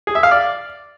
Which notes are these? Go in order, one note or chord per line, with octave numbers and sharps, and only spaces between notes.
G#4
E5
F5
D5